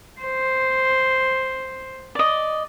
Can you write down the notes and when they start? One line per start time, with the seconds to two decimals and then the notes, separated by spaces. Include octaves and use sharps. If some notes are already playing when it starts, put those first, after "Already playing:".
0.21 C5
2.15 D5 D#5